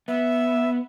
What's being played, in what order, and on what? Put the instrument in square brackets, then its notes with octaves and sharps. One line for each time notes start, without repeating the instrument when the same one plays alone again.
[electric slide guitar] B3 [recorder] E5